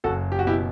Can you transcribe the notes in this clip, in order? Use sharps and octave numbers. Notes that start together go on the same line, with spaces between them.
F#1 F#4 A4
G4
F#4
B2 E4 G4